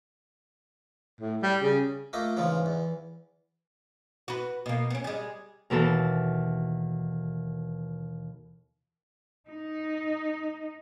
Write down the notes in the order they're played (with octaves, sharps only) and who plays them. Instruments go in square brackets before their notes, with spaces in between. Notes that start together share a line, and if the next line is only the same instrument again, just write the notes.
[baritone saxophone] A2
G3
C#3
[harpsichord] A3 A#3 D#5 [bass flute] F4
[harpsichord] G#2 C#3 F3 [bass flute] E3
[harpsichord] E2
[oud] F#4 B4
B2 A#3
B3 C#4
G3 G#3
[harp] D#2 B2 E3 A4 A5
[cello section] D#4